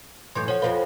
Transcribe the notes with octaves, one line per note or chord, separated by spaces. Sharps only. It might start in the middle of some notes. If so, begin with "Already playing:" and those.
F#2 A2 E3 C6 G6
F3 C#5 F#5
F2 F3 B4 F5